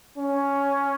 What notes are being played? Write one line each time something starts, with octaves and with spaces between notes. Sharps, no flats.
C#4